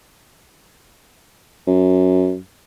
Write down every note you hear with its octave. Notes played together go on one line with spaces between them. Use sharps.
F#2